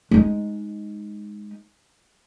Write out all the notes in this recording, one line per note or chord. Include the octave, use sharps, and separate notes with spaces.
G#3 D#4